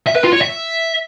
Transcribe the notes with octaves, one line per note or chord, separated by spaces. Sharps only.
E5
B4
F4
C#5
E5